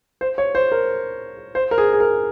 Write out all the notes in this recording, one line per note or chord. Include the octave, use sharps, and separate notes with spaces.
C5
C#5
C5
A#4
C5
A#4
G#4
G#4
A#4